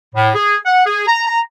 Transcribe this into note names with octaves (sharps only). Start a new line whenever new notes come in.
A2
G#4
F#5
G#4
A#5
A#5